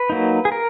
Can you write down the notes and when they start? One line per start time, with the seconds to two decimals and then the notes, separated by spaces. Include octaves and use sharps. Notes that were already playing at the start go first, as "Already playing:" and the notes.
Already playing: B4
0.10 F#3 A#3 D#4
0.45 G#4
0.52 A#4